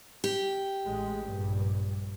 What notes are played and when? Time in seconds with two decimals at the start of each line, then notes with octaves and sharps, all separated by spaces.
0.24 G4
0.86 A1 G#3
1.22 A#1 G2